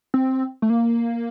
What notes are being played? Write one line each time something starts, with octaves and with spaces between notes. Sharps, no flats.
C4
A3
A#3